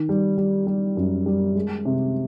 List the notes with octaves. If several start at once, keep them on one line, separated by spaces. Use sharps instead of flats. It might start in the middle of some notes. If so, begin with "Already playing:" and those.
Already playing: D#3
G3
G3
G3
F#2
G3
G#3
C3